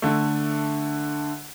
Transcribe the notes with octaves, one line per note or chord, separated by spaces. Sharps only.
D3 A3